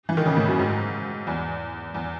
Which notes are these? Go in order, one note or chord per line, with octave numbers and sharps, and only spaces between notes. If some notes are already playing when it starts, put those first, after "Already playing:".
E3
D#3
C#3
A2
F#2
G#2
E2
E2